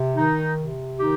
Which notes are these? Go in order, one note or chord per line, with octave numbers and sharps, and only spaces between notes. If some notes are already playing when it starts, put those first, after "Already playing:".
Already playing: C3
D#3 D#4
C3
D#3 D#4 G4